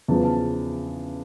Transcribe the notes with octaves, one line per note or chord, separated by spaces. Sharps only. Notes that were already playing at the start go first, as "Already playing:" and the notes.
E2 C#3 F3 A5
A5